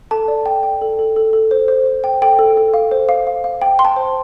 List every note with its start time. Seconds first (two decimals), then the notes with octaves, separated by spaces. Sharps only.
0.11 A4 A5
0.28 D5
0.46 G5
0.63 G5
0.81 A4
0.99 A4
1.16 A4
1.33 A4
1.51 C5
1.68 C5
1.86 C5
2.04 G5
2.22 A4 G5
2.39 A4
2.57 A4
2.74 F5
2.91 C5
3.09 F5
3.27 F5
3.44 F5
3.62 G5
3.79 G5 C6
3.85 A5
3.96 C5